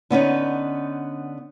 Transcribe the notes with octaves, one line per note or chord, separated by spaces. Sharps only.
D3 B3 C#4 D#4